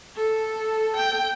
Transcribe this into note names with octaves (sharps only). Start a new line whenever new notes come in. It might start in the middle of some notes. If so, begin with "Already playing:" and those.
A4
G5